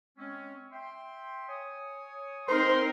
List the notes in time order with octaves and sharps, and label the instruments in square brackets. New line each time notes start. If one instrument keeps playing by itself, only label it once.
[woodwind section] G#3 C4 C#4
E5 G5 C6
C#5 G#5 D#6
[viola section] C4 D#4 A#4 [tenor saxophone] C5 [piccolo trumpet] C6